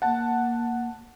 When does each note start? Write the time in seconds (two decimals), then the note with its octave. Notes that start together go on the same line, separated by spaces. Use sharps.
0.02 A#3 F#5 A5